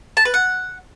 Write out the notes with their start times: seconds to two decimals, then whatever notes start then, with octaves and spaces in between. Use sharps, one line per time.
0.17 A5
0.25 B4
0.34 F#5